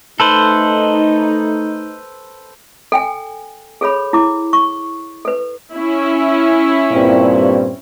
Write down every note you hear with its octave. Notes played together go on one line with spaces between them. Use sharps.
A3 D#4 A4 B4 C5
A4 G5 G#5
G#4 A4 C#5 B5
E4 D6
C#6
A4 B4
C#4 E4
G2 A#2 C4